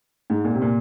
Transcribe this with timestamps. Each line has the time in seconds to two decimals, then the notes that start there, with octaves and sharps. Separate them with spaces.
0.30 G#2
0.44 A#2
0.54 C3
0.62 A#2